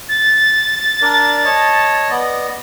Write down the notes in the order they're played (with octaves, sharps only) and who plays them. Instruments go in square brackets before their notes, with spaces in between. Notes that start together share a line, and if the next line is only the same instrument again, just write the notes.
[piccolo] A6
[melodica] D4 A#4 D5
C#5 D#5 A5
B3 D5 D#5